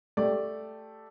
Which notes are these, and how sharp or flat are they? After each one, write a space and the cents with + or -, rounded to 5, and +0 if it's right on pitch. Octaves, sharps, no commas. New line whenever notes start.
A3 +0 G4 +0 D5 +0